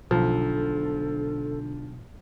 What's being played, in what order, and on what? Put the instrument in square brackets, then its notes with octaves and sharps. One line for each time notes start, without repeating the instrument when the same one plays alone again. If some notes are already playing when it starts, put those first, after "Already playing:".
[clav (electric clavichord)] B1 [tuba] D3 [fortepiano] F3 [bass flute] A4